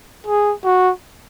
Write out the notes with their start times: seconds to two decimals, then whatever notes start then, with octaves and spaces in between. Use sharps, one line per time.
0.27 G#4
0.64 F#4